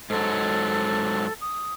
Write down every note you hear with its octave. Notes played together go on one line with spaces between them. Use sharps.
G#2 F#3 A4
D#6